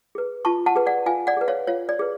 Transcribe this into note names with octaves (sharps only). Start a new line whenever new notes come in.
G#4 B4
F4 A5 C#6
F#5 A5
G#4 B4
D5 F#5
F4 F5 G#5
D5 F#5
G#4 B4
C#5 F5
F4 C#5 F5
D5
G#4 B4